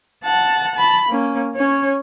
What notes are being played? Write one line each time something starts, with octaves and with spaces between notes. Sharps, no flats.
F#5 A5
A5 B5
A#3 C#4
C#4 C#5